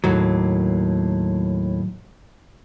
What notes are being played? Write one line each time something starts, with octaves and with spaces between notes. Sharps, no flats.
D#2 A2 F#3 A#3